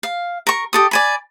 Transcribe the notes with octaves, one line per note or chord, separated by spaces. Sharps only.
F5
A#4 C#6
G4 A4 D#6
D5 G#5 B5